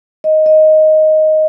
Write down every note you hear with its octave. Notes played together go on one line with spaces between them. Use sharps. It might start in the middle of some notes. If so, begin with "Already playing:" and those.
D#5
D#5